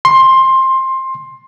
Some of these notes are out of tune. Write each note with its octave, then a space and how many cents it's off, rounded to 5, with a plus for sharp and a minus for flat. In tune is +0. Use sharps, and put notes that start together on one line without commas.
C6 +15